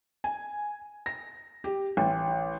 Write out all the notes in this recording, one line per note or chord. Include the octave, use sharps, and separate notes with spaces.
G#5
A#6
G4
A1